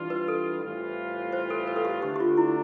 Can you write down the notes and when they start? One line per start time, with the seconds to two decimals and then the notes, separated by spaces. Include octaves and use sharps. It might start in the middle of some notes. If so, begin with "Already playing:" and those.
Already playing: E3 G3 D4 F4
0.10 B4
0.28 A4
0.63 A2 E3 G3 C4 F4
1.33 C5
1.50 A4
1.67 B4
1.76 A4
1.85 G4
2.02 D3 A3 D4 G4
2.16 G4
2.20 F4
2.37 E4